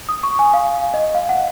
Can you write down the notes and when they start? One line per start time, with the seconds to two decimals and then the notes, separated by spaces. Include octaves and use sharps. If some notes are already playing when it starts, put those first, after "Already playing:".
0.09 D#6
0.23 C#6
0.39 G#5
0.54 F5
0.94 D#5
1.15 F5
1.29 F#5